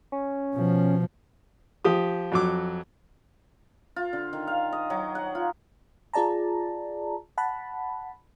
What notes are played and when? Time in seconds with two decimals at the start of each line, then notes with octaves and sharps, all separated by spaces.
0.12 C#4
0.54 B2 F3
1.85 F3 G4 D#6
2.32 F2 F#3 D6
3.96 F4
4.13 D3
4.33 D#3
4.47 F5
4.73 D#5
4.90 F#3
5.15 F#5
5.35 F4
6.14 F4 G#4 D5 A5 A#5
7.38 F#5 A5 B5